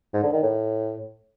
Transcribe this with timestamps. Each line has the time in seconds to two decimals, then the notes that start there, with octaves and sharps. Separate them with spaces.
0.14 G#2
0.23 D3
0.33 D#3
0.43 A2